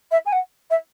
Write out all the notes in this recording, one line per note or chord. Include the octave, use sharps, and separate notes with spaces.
E5
G#5
F#5
E5